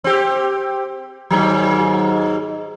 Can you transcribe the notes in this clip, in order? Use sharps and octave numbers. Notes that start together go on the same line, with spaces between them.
C4 G4
D#2 G#2 F#3